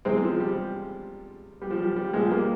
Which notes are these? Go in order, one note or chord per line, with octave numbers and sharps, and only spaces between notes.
E2 C3 E3 G#3 C4
F3
G3
G3
F3
G3
G3
C2 A#2 F3 G#3
G3 A#3